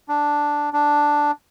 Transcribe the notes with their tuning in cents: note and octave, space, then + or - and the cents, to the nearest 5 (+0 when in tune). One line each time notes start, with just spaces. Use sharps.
D4 +0
D4 +0